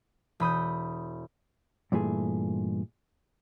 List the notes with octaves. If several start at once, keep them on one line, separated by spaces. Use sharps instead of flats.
E1 B5 D#6 G6
G2 A#2 E3 A3 G#4